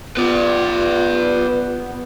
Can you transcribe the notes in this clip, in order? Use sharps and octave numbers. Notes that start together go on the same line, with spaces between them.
B3 F4 B4 D5